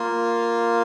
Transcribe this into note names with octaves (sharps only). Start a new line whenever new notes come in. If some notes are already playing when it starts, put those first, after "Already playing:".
Already playing: A#3 F4